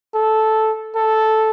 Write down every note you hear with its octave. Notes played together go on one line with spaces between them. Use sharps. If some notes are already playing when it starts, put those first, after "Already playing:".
A4
A4